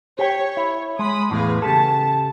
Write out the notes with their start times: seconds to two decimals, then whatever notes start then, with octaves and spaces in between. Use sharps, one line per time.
0.19 G4 C#5 G5
0.57 E4
0.99 G#3 B5 D#6
1.31 E2 A2 G#4 B4 F5
1.62 C#3 G4 A4 A5